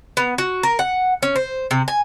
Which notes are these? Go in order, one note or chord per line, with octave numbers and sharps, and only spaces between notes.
B3
F#4
A#4
F#5
C#4
C5
C3
G#5